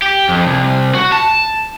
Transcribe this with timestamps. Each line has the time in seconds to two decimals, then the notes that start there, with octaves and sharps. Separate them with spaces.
0.02 G4
0.29 F2
0.47 C2
0.95 F#4
1.12 A5